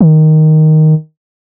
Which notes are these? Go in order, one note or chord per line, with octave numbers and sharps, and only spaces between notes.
D#3